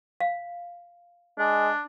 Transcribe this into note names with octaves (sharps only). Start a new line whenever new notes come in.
F5
G#3 D4